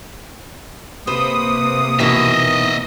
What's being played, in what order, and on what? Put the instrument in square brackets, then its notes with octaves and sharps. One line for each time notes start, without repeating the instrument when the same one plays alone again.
[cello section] C3 A#3 [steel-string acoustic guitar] B4 C5 [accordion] D#6
[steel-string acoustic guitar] B2 D#3 E3 [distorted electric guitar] D#5 E5